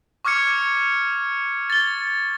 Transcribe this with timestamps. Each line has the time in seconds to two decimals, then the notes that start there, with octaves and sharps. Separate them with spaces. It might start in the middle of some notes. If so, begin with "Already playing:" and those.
0.25 C#6 D6 F6 G#6 C#7
1.70 A6 G7